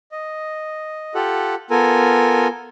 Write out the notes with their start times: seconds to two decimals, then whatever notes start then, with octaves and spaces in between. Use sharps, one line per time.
0.12 D#5
1.15 F4 G4 A4 F#5
1.70 B3 F4 A4 A#4 G#5